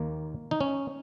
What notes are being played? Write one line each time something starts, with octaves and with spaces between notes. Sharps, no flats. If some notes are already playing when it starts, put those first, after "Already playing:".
Already playing: D#2 D#3 A#3
D#4
C#4